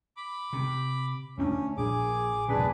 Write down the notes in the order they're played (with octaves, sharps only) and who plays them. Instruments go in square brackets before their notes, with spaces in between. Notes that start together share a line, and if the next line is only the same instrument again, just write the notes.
[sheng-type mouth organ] B5 D6
[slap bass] C3
[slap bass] D2 A#3 D4 [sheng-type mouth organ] C#4
[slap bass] A#1 [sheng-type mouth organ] G#4 D6
[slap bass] E1 B1 A#2 [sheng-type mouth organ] D4 G#4 B4